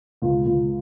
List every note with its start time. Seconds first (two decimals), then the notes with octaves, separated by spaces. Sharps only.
0.22 C#2
0.46 C#2